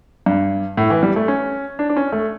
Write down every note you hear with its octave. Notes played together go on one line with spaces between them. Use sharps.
G2
A2
E3
G3
A3
C#4
D4
D4
C#4
A3